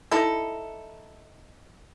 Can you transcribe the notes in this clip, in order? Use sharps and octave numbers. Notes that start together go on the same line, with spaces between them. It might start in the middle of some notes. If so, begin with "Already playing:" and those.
D#4 E4 A4